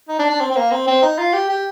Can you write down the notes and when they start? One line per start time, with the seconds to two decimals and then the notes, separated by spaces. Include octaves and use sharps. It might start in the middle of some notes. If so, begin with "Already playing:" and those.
0.08 D#4
0.19 D4
0.30 D4
0.40 C4
0.51 C4
0.56 A#3
0.71 C4
0.87 C4
1.02 D#4
1.18 F4
1.33 G4
1.49 G4